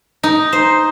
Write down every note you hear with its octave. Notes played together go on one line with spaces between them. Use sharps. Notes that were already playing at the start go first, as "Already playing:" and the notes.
D#4
C5